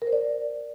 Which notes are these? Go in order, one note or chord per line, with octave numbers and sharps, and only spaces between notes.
A#4
C5
D5